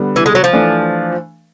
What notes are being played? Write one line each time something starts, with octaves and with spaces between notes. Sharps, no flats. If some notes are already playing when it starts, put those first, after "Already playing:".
Already playing: D3 G3 B3
E3
G#3
F#3
F3
E3 A3 D4